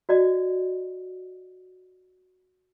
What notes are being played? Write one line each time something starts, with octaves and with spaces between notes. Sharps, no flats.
F#4 D5 D#5